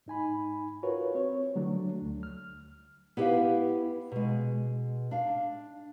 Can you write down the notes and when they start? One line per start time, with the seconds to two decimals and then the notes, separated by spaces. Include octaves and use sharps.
0.06 G#2 D#4 G#5 B5
0.83 F4 F#4 A#4 B4 C#5
1.15 C4 C#5
1.56 D3 F#3 A3 D4
2.02 D2
2.23 F6
3.17 B3 E4 G4 B4 C5 F5
4.12 B2 G#3
5.11 D4 F5